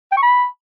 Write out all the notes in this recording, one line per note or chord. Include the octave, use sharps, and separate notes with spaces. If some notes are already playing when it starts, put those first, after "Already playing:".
G5
C#6
B5